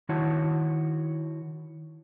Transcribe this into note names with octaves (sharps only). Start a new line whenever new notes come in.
D#3 E4 F#4 C#5 A5